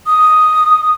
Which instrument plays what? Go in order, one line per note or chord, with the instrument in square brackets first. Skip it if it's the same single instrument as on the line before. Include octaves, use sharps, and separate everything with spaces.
[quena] D#6